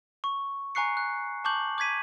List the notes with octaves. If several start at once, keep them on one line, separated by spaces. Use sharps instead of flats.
C#6
G#5 A#5 C#6 F#6 C7 C#7
F#6
A5 C#6 D6 G6 F#7
D6 G6 G#6 B6 D#7